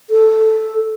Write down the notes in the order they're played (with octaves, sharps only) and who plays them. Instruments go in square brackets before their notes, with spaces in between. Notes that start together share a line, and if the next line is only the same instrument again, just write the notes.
[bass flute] A4